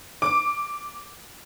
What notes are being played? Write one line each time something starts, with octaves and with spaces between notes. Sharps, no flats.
D6